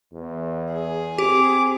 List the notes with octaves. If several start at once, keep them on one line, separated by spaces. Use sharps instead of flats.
E2
G#4
C4 G4 D6